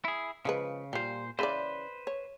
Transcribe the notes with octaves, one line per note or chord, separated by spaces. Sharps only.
E4 G#4
C#3 F3 G#3 B4
A#2 G3 F4 C5
C#3 E3 B4 C5 D5
C#5